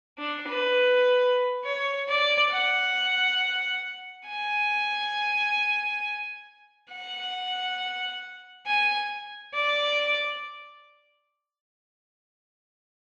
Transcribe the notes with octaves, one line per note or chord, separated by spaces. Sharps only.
D4
B4
C#5
D5
F#5
G#5
F#5
G#5
D5